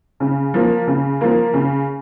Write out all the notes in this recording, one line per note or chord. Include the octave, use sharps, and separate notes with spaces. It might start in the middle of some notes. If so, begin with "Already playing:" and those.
C#3
F3 A#3
C#3
F3 A#3
C#3